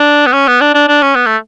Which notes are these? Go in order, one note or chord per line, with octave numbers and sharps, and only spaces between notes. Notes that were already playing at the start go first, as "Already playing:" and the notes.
Already playing: D4
B3
C#4
B3
D4
D4
D4
C#4
B3
A3